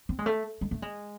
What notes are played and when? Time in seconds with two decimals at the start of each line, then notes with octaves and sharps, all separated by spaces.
0.09 C4
0.19 G#3
0.26 A3
0.61 G#3
0.71 A3
0.82 G#3